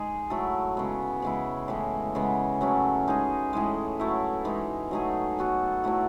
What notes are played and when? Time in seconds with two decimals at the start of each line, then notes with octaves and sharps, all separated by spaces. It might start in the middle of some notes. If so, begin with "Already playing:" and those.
Already playing: G#3 D#4 G#4
0.30 F#3 A3 E4 A4
0.77 C#3 G#3 B3
1.22 C#3 G#3 B3 E4
1.68 A2 E3 G#3
2.15 C#3 G#3 B3
2.61 F#3 A3 C#4 E4
3.07 G#3 D#4 G#4
3.53 A2 E3 G#3
3.99 F#3 A3 E4
4.45 E3 G#3 D#4
4.91 F#3 A3 D#4 G#4
5.38 F#3 B3 F#4 A4
5.84 A2 F#3 A3 E4